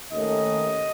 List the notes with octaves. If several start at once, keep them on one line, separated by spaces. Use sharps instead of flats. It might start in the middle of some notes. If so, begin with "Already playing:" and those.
D#2 D#3 A3 C#4 D#5